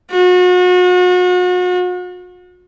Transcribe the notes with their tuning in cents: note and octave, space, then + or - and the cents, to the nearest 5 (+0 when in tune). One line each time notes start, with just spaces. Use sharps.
F#4 -40